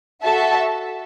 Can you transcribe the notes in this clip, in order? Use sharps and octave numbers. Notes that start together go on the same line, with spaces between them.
F#4 A4 E5 A5